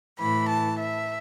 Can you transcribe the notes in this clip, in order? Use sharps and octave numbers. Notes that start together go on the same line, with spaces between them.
A2 E3 B5
A5
E5